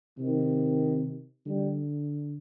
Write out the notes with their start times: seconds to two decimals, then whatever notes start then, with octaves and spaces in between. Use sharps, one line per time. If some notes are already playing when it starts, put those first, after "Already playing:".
0.18 C3 D#3
1.46 D3 G3